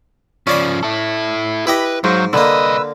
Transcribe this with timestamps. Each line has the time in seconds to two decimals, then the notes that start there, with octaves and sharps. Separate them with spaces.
0.47 C#3 F3 C#4 D5 B5
0.83 E4 A4
1.67 E4 G4 B4 D#5
2.04 G#2 F#3 C5 F5 C#6
2.33 C2 D3 A#3 B4 D#5 E6